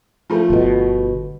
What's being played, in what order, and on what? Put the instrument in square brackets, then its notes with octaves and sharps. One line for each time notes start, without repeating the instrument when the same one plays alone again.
[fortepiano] F3 A3
[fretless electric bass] G1 B2